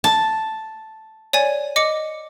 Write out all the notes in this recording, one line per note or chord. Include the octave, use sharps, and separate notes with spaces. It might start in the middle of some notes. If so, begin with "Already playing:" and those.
A5
C#5 D5 G#5
D#5 D6 C#7